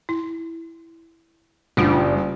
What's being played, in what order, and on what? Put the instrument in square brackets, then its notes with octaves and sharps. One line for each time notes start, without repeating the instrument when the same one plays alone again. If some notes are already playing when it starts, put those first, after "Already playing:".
[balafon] E4
[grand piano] F#1 [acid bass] G3 [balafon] A3 D4 F4